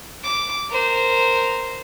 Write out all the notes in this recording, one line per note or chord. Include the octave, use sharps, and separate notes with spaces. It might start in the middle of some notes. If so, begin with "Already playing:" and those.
D6
A#4 C5